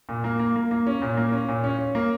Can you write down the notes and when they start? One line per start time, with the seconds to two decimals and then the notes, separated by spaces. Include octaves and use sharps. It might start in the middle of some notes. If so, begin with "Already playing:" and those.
0.09 A#2
0.24 A#3
0.40 A#3
0.56 A#3
0.71 A#3
0.87 C#4
1.02 A#2
1.17 A#3
1.32 C#4
1.49 A#2
1.64 C#4
1.79 C#4
1.95 A#3